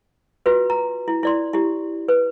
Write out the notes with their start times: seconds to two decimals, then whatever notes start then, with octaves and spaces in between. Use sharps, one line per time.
0.46 F4 F#4 B4
0.70 A#5
1.08 E4
1.23 E4 D5 C6
1.53 E4 G4
2.08 B4